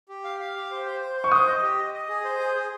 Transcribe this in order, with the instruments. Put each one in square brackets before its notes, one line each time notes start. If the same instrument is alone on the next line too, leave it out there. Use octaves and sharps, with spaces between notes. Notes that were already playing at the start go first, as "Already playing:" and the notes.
[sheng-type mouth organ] G4
F5
F5
G4
C5
C5
C5
C5
[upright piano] C#6
[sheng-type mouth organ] C5 [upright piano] D#6
[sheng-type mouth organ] D#5
G4
D#5
D#5
G#4
C5
G#4
G#4